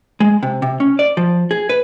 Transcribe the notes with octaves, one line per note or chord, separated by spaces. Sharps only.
G#3
C3
C3
C#4
D5
F3
G#4
B4